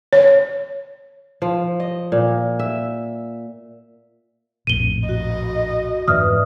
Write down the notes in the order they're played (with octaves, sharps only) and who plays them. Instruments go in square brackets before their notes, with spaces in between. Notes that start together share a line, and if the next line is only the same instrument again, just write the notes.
[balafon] C#5
[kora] F3
D#5
A#2
E5
[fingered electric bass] A#1 F2 A2 [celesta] D#7 G7
[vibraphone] F#4 [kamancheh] D#5
[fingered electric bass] F2 G#2 E3 [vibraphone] B4 D5 E5 [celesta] D#6 F6